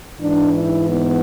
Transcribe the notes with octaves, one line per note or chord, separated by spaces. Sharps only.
G#2 E3 D4
E4
B3